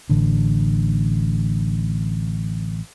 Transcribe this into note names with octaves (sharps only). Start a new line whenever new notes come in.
A1 D3